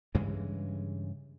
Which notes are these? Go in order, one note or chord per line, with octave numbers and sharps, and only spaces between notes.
G2 C#3 E3 G#3